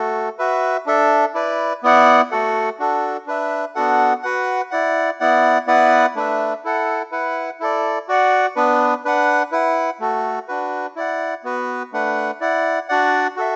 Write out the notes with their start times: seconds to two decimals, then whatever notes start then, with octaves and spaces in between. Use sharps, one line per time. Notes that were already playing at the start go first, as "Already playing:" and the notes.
Already playing: A3 F#4 A4
0.39 F#4 B4 E5
0.86 D4 A4 E5
1.34 E4 B4 D5
1.83 B3 E4 D5 F#5
2.31 A3 F#4 A4 F#5
2.79 D4 F#4 A4
3.26 D4 B4 E5
3.75 B3 D4 F#4 A4 F#5
4.23 F#4 B4 F#5
4.71 E4 D5 F#5
5.20 B3 E4 D5 F#5
5.67 B3 E4 B4 D5 F#5
6.15 A3 D4 B4 E5
6.64 E4 A4 F#5
7.12 E4 B4 F#5
7.60 E4 A4 D5
8.09 F#4 D5 F#5
8.56 B3 D4 B4
9.05 D4 B4 F#5
9.52 E4 B4 F#5
10.00 A3 F#4 A4
10.48 D4 F#4 B4
10.96 E4 D5 F#5
11.44 B3 F#4 B4
11.93 A3 D4 B4 F#5
12.41 E4 D5 F#5
12.89 D4 F#4 D5 F#5
13.36 F#4 A4 E5